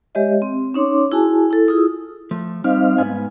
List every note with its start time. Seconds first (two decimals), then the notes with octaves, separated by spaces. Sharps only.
0.15 G#3 G4 C#5 D#5 E5
0.42 C4
0.74 C#4 D#4 C#5 C6 D6
1.12 E4 F#4 G#4 G#5 A5
1.51 E4 A4
1.67 E4 F4 G#4 D#6 E6
2.31 F3 A3
2.64 G3 C4 D#4 F5
2.98 G#2 B3 G#5